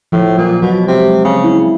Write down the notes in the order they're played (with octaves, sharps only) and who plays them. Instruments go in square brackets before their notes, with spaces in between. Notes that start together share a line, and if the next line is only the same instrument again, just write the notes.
[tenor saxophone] A2 [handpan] F3
[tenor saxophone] A#2 [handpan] F#3
[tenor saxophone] B2 [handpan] F#3
[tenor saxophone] C3 [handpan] G#3
[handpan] G#3
[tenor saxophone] C#3 [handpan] C4
[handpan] E4